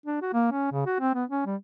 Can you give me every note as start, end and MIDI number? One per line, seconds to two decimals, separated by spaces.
0.06 0.19 62
0.21 0.32 66
0.33 0.47 58
0.52 0.71 61
0.71 0.83 49
0.86 0.96 66
1.00 1.12 60
1.14 1.24 59
1.30 1.44 61
1.46 1.56 55